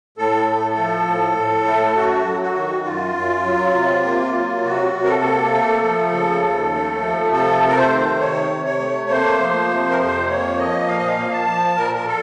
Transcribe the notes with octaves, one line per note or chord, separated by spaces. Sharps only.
A2 A4
A3
F3
A2
A2
A3
F#2 F#4
F#3
F#4
D#3
F#2 F4
F#2
F#3
C3
A#3
F#3
C3 F#4
C3
A#4
A4
A#3
A3
F3
C#3
D#2
A3
F3
C3 A4
A3
A#4
C5
D#3
C3 C#5
C3
C#5
A3
A#3 C5
F3
C3
A#4
F2 C5
A#3 C#5
F3 D#5
A#2 F5
D#5
F5
A#3
A5
F3
A#2 A#4
A#4
A4